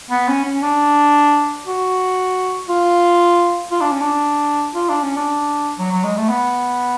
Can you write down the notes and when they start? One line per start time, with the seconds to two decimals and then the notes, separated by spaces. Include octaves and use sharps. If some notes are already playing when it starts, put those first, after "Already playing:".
0.11 B3
0.28 C#4
0.45 C#4
0.63 D4
1.66 F#4
2.69 F4
3.71 F4
3.81 D4
3.92 C#4
4.01 D4
4.75 F4
4.89 D4
5.03 C#4
5.17 D4
5.78 F#3
5.91 F#3
6.04 G#3
6.17 A3
6.30 B3